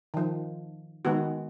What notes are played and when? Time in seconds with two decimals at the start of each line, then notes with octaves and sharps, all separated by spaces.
0.14 D#3 F3
1.05 D#3 G#3 B3 F#4